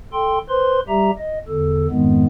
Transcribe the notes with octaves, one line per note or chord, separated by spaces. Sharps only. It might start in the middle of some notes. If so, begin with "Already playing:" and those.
A4 G5 C6
B4 C5 C6
G3 G4 E5 A#5
D#5
E2 D3 A4
F2 G#2 D#3 G#3 B3